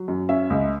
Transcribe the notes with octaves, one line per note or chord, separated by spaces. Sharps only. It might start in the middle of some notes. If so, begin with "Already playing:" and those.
Already playing: F#3
F#2
C#4 E5
C#2